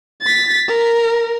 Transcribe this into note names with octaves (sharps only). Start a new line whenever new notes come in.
A6 B6
A#4